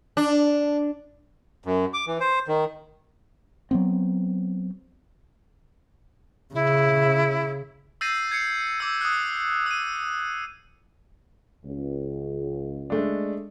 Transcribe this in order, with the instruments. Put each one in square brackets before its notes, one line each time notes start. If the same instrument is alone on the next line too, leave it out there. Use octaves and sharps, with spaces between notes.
[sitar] D4
[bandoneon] F#2
D6
E3
C5
D#3
[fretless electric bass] F#3 B3 C4
[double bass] C#3 [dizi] E4
[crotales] E6 G6 A6 A#6 C7 D#7
G#6 C7 C#7
D6 E6
D#6 F#6
E6 D#7
[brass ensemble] C#2
[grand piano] G#3 A3 D4